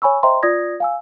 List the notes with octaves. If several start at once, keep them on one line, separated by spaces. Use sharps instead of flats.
C#5 G#5 B5 C#6 E6
C5 D#5 E5 G5 A#5 C6
F4 D5 D#6 G#6 A#6
F5 G#5 E6